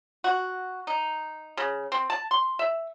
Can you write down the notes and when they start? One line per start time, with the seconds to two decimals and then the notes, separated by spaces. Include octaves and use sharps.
0.24 F#4
0.87 D#4
1.57 C#3
1.92 C4
2.10 A5
2.31 C6
2.59 E5